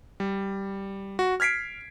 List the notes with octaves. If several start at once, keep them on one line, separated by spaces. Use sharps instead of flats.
G3
F#4
F6 G#6 B6 C7 D7